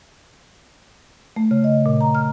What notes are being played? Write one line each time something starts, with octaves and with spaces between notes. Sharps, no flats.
A3
C#3
D#5
A#2
A#5
F6